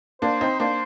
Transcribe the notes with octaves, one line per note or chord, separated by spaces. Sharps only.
A#3 D4 C5
C4 D#4
A#3 D4 C5